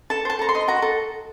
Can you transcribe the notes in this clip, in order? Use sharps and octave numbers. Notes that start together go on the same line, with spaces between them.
A4 A5
C5 A5
A4 A#5
C6
D#5
F#4 A#5
A4